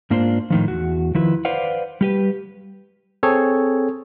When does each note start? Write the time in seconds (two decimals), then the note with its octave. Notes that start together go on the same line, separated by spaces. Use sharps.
0.10 G#2 A#3 D4 F4 C5
0.50 A2 D#3 F3
0.68 E2 F#4
1.15 D#3 F3 E4 B4
1.45 B4 C5 D5 F5 F#5
2.01 G3 G4 B4
3.23 C4 G#4 A4 C#5